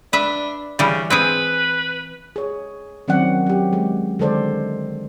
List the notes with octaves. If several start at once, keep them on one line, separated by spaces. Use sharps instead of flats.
D4 B4 E5
C#3 E3 G3
C4 E4 G#4 B4
G#4 C#5
D#3 F#3 C4 C#4 D5 F#5
F#3 G4
G#3
D3 D#3 G#3 A4 C5 D5